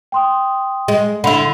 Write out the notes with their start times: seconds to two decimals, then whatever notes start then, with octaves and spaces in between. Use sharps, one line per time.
0.12 G5 C6 D#6
0.88 G#3
1.24 D3 E4 B5 C6 F7